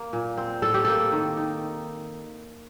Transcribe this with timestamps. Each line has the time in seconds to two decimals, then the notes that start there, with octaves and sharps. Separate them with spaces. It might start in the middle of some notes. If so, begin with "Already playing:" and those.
Already playing: A#3
0.13 A#2
0.38 C4
0.62 A2 A4
0.74 G4
0.85 A#3 A4
1.12 D#3
1.37 D#4